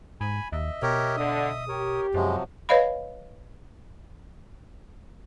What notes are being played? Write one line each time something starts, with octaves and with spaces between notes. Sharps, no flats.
G#2 G#5 B5
D#2 D#5 E5
B2 G4 A#4 C#5
D3 D#6
G4 A#4 C#5
F#2 C3 F3 F#3 G#3
B4 C#5 D#5 F5 B5